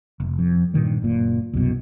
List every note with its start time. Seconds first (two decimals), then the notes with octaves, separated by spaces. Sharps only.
0.20 F1
0.39 F2
0.74 G2 A#2 D#3 G3
1.02 F#1 A#2
1.53 C2 F#2 B2